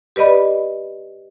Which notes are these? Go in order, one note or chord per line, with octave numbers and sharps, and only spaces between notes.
G4 B4 D5 D#5 B5